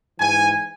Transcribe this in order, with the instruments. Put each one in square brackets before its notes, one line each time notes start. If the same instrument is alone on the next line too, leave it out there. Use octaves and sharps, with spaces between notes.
[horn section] G#2 E3 G#5